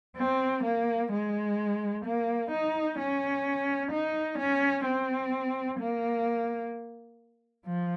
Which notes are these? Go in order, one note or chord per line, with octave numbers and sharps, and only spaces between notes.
C4
A#3
G#3
A#3
D#4
C#4
D#4
C#4
C4
A#3
F3